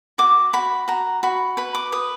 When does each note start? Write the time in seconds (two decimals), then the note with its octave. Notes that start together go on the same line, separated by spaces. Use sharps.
0.18 F#4 D6
0.53 F#4 B5
0.88 F#4 A#5
1.23 F#4 B5
1.57 B4 B5
1.75 D6
1.92 B4 D#6